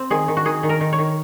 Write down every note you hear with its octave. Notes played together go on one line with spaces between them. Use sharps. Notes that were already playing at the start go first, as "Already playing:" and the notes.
Already playing: C4
D#3 G#4
D#3
F#4
D#3 G#4
D#3
A#4
D#3
C#5
D#3